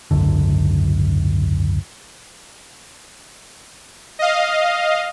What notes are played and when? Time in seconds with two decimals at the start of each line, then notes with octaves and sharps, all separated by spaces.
0.11 G#1 C#2 F#2 D3
4.19 D#5 F5